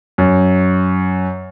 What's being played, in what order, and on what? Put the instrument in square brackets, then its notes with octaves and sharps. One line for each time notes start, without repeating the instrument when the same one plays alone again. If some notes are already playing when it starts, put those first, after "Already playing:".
[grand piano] F#2